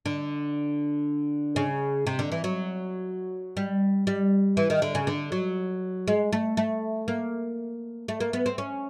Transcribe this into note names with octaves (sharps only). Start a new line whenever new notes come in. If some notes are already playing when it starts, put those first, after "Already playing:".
D3
C#3
C3
D3
E3
F#3
G3
G3
E3
D#3
D3
C#3
D3
F#3
G#3
A3
A3
A#3
A3
A#3
B3
C4
C#4